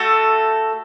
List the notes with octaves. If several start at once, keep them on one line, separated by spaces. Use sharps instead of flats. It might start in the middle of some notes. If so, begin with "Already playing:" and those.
Already playing: A3 F#4 A4